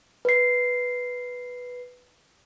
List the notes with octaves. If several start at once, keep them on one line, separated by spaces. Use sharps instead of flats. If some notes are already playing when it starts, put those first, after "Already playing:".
B4 C7